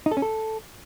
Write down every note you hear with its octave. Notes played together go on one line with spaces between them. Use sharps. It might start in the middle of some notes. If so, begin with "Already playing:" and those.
D#4
A4
C#4
A4